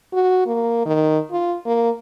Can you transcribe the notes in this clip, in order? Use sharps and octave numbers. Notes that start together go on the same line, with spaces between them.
F#4
A#3
D#3
F4
A#3